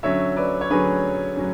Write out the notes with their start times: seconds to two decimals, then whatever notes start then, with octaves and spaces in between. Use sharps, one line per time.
0.03 D3 F#3 C#4 C#5 E5
0.36 B4 D5
0.61 C#5
0.70 D3 F#3 C#4 G#4 B4
1.37 F#3 C#4